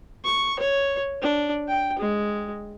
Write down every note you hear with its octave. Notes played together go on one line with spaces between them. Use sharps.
C#6
C#5
D4
G5
G#3